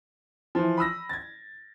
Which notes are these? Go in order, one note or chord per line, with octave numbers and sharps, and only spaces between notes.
E3 F3
B5 D#6 E6 A#6
G#6 A6